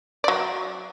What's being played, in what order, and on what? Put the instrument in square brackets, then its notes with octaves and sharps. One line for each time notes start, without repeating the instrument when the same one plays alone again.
[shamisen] F#3 D5